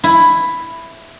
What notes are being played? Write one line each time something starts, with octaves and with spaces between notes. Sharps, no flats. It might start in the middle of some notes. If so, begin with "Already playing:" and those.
E4